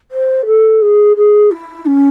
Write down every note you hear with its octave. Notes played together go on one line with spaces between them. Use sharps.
C5
A4
G#4
G#4
E4
C#4